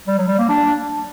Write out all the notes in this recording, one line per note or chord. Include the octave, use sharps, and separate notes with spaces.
G3
F#3
G3
A#3
D4